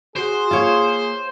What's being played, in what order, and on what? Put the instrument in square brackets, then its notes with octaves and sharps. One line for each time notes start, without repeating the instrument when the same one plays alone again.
[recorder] F#4 [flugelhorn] G#4 [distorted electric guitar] C5
[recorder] A#3 [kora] F4 C#5